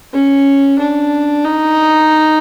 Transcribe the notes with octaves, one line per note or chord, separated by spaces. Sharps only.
C#4
D4
D#4